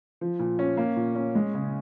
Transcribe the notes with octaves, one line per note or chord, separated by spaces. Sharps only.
F3
A#2
C#4
A#3
A#2
C#4
G#3
C#3